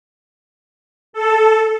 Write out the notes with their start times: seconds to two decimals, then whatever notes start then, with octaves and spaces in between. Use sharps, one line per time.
1.13 A4